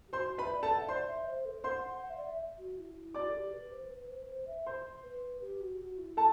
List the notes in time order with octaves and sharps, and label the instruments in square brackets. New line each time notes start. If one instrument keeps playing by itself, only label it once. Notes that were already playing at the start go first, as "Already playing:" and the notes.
[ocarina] G4
[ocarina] F#4 [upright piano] C5 C6
[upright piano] B4 B5 [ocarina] E5
[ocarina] D5
[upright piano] A4 A5
[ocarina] F#5
E5
[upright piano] C5 C6 [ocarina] D5
[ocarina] E5
C5
A4
[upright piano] C5 C6 [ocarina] F#5
[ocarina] F#5
E5
D5
E5
F#4
E4
E4
[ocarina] F#4 [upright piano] D5 D6
[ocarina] A4
G4
B4
C5
B4
C5
C5
E5
[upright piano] C5 C6
[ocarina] B4
G4
F#4
F#4
E4
[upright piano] A4 A5